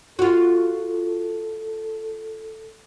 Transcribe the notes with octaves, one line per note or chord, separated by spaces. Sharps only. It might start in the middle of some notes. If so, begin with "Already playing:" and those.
F4 F#4 A4